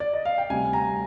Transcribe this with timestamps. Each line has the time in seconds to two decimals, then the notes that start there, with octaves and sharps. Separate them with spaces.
0.00 D5
0.13 D#5
0.25 F5
0.38 G5
0.50 D2 C3 G3 G#5
0.73 A#5